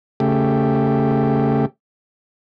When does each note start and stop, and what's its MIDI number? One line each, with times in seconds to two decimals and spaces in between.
0.20 1.66 49
0.20 1.66 57
0.20 1.66 67